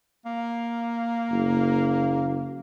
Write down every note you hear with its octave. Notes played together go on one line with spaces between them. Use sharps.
A#3
F#1